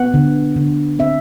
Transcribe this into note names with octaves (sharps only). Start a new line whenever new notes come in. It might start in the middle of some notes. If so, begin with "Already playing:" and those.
Already playing: B3 F#5
D3
D3
C4 E5